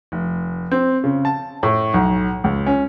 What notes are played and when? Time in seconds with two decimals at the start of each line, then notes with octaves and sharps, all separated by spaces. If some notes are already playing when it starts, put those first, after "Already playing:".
0.12 F1
0.72 C4
1.04 C#3
1.25 A5
1.63 A2
1.94 B1
2.44 C#2
2.67 C#4